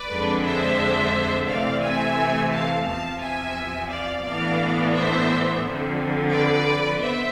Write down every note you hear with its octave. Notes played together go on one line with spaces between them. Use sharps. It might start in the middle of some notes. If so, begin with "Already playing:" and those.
Already playing: B4 D5
F2 D3 G#3 D4
C5 E5
C3 E3 A3 C4 D5 F5
E5 G#5
F5 A5
E2 C3 F3 F5 A5
E5 G#5
D5 F5
A2 E3 B3 D4 D5 F5
C5 E5
F2 D3 F3
B4 D5
B3 C5 E5